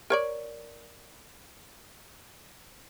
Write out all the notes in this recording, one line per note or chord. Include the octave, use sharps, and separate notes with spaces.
A#4 C#5 D5